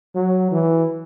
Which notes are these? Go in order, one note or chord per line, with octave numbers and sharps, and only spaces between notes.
F#3
E3